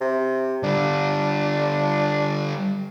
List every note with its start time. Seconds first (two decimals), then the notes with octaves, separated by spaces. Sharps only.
0.01 C3
0.63 D3 G3 D4